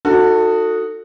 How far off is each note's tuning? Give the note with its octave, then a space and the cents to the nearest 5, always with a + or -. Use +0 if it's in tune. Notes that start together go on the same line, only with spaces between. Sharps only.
D#4 +0 F#4 -10 A4 +25